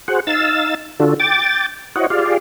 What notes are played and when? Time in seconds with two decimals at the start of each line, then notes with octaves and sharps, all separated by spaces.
0.08 F#4 G#4 C5 F#5
0.27 D#4 F5 E6 A6
1.00 D3 D4 F4 F#4 A4
1.20 G5 D6 A6
1.96 E4 F#4 C5 C#5 D#5 F#5
2.10 F4 G4 G#4 D5 F5